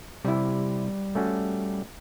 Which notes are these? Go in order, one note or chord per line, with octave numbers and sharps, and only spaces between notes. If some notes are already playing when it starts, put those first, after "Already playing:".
C3 G3 E4
A3 C#4 F#4